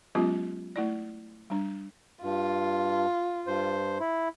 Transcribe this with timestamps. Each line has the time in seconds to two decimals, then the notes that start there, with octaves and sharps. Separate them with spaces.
0.15 F#3 G#3 B3 C#4 F4 G4
0.76 A3 E4 D5
1.50 G3 D4
2.23 G2 F4
3.47 G2 C5
4.00 E4